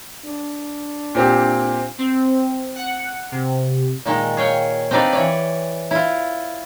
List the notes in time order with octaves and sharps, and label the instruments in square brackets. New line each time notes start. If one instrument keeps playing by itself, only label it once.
[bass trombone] D4
[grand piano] A#2 C4 G4
[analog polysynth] C4
F#5
C3
[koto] A#2 D#3 G#3
G#4 C#5 F5 G5
C4 D4 D#4 B4 D5 F5
E3 C#5 D5
E4 F4